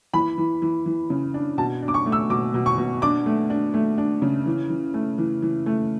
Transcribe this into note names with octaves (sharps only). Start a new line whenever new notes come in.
E3 B5
E3
E3
E3
C#3
D4
B2 A5
D4
D6
C#6
A3
E6
B2 D6
B2
C#6
B2
D4 D6
A3
D4
A3
D4
C#3
E3
E3
A3
E3
E3
A3